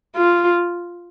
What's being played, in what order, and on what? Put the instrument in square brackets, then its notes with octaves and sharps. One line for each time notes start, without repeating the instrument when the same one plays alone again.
[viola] F4